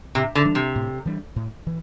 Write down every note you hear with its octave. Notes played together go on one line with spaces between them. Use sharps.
A2 C3
D3
E3 G3 D4
C3
A2
E3 G3 D4
A2
E3